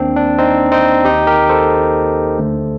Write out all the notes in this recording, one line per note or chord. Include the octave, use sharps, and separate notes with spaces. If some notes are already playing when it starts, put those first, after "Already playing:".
Already playing: D#2 D#3 A#3 C4 D4
D4
C4 D#4
C4 D#4
D#2 D#3 A#3 D#4 G4
G4 A#4
A4 C5
D2 D3 A3